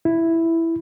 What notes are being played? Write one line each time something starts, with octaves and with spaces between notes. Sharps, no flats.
E4